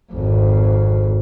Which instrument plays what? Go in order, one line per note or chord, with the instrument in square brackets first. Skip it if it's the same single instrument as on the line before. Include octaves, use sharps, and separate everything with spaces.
[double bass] G#1 F2